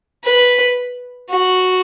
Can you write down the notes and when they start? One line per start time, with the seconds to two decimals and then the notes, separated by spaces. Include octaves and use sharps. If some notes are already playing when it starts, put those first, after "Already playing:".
0.24 B4
1.30 F#4